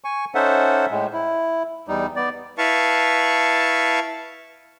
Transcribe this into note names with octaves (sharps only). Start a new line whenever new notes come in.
G#5 C#6
C#4 D#4 A4 C5 E5 F#5
A2 G#3
E4
E2 G3 D#4
B3 D5
E4 B4 F5 A5 C#6